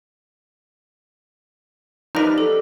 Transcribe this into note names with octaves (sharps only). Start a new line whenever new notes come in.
F3 D#4 G4 A#4 B4 D5 F6 A#6
A4